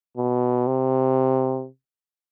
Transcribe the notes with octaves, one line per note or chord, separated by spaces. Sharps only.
B2
C3